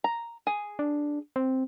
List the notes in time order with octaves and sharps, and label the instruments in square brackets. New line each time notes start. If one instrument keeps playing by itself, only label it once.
[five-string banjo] A#5
G#4
[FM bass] D4
C4